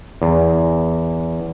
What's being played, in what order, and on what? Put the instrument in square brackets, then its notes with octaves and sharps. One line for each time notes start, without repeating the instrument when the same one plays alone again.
[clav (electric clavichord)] E2